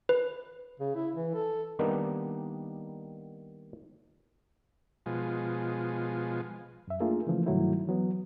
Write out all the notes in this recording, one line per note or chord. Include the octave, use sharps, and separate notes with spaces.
B4
C#3
E4
E3
A4
D#3 G3 A#3 B3 D4 D#4
B2 F3 G#3
F#2 E5
A3 A#3 D4 F4 G#4
C#3 E3 F3 A3
G2 C3 D#3 F#3 A3 E4
E3 F#3 B3